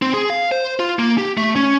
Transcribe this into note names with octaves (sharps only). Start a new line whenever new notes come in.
C4
G#4
F5
C5
F4
A#3
G4
A3
C#4